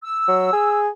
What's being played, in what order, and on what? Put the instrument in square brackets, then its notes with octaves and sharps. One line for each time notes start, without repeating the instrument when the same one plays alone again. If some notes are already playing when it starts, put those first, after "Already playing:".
[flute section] E6
[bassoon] F#3
G#4